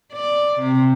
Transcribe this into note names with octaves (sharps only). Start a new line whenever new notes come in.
D5
C3